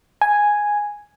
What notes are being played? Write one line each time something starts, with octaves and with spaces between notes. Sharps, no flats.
G#5